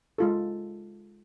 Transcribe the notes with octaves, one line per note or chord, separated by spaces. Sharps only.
G#3 F4 A4